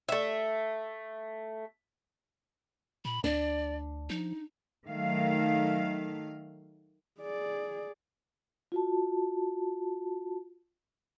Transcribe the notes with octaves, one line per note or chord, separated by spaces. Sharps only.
A3 E5
A#2 B5
D2 D4 D5
F3 D#4
D#3 F#3 A3 F5
G#4 D5
F4 F#4 A5